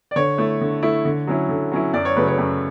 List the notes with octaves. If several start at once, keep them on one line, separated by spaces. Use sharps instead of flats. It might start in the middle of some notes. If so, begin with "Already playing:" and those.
D5
D3 C#5
A3 E4
D3
A3 E4
D3
F#3 C#4 E4
D3
F#3 C#4 E4
F#2 D5
C#5
C#3 F#3 A3 B4
C#5
F#2